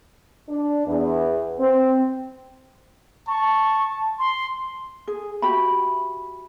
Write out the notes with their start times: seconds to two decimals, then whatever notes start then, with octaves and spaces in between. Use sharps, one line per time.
0.49 D4
0.87 E2
1.60 C4
3.28 A5 C#6
4.19 C6
5.07 G#4
5.42 F#4 G4 E5 B5